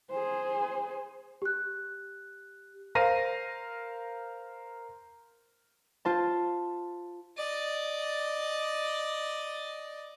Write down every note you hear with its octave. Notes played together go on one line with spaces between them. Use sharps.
G#4 C5
G4 F#6
A#4 C5 F5 A#6 D#7
F4 C5 A5
D5 D#5